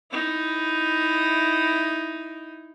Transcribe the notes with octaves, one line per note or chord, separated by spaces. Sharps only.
D#4 E4